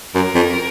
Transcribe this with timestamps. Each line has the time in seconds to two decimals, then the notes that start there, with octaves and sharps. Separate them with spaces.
0.15 F#2 A#4
0.35 F2